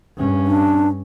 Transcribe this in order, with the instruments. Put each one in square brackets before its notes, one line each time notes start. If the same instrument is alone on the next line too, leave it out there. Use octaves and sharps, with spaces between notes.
[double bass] G2 C#4
[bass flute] D4